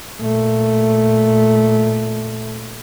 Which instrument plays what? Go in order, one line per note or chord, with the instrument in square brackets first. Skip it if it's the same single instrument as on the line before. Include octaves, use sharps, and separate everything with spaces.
[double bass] A#2 A3